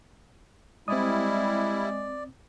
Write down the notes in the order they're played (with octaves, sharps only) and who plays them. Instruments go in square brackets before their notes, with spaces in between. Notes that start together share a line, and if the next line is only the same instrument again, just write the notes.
[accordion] G3 E4 [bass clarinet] G#3 [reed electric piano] C4 D#6 [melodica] D5